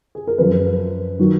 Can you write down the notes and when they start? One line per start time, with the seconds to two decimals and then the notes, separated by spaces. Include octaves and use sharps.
0.15 G#4
0.27 A#4
0.38 F#2 F3 B4
1.19 D#3 F#3